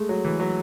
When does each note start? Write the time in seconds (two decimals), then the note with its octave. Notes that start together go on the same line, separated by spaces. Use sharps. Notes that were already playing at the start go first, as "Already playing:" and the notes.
Already playing: G#3 A3
0.09 F#3
0.25 E3
0.40 F#3